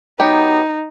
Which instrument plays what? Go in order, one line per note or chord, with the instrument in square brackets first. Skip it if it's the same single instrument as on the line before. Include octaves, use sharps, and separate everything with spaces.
[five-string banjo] F#3 B3 G4 [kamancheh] D#4